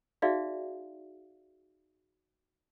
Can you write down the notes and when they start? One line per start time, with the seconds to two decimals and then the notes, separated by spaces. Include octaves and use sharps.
0.22 D#4 F#4 G#4 D5 E5 F5